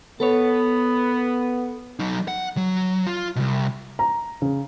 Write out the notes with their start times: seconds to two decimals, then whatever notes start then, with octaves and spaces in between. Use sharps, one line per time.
0.20 B3 A4 B4 C#5
1.99 F#3 D#4
2.28 F#5
2.57 F#3
3.07 F4
3.36 C2 B2
3.99 A#5
4.42 C#3